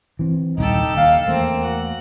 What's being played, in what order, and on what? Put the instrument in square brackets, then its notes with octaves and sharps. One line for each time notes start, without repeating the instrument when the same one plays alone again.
[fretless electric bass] E3 C4
[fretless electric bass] D#1 C2 [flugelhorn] D#4 [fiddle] G4 A4
[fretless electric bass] D#2 [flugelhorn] F5
[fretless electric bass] E2 A3 [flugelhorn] A#3 [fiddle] C4
[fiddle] F#4